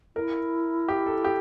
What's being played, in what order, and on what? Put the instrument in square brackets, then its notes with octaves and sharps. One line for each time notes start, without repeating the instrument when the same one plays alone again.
[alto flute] E4 [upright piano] A#4
[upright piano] G4
A4
G4